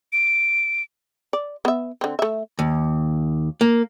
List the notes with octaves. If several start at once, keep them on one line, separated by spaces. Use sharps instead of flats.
D7
D5
B3 E5
D3 C4
A3 E5
D#2
A#3